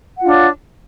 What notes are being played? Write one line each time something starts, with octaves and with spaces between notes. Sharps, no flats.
D4 F4 C#5 F#5